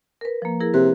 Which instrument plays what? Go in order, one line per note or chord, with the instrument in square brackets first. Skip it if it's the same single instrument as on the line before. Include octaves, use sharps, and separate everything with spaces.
[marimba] A#4 B4
F3 A#3
E4 G#4 A#4
[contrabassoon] C3 [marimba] B4 F#6